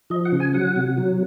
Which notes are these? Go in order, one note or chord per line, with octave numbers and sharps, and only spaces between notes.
F3 D#5
F#5
C#3
G#5
F#3 F#5
C3
F#3